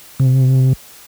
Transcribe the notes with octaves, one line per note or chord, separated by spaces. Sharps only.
C3